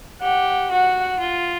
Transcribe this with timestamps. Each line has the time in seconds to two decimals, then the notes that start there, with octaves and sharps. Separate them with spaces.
0.21 G4 F#5
0.70 F#4 F#5
1.19 F4